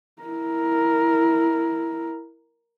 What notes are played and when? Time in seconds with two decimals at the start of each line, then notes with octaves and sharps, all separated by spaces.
0.23 E4 A#4